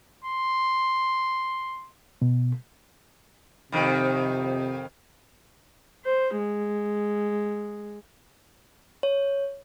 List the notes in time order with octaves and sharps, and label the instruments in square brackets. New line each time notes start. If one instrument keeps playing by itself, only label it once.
[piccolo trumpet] C6
[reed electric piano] B2
[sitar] F2 D#3 [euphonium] C3
[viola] C5
G#3
[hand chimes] C#5